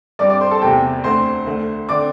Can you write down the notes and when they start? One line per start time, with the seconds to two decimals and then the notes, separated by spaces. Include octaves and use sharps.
0.19 G2 G3 C4 D5 D6
0.30 D5 D6
0.41 C5 C6
0.51 A4 A5
0.61 E2 C3 A3 G4 G5
1.04 D2 D3 A3 C4 C5 C6
1.46 D2 D3 A3
1.89 D3 C4 D5 D6